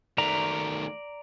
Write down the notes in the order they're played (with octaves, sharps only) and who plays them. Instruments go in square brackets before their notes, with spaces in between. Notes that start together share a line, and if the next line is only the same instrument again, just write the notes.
[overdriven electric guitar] D#3 A3 [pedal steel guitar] D5 A#5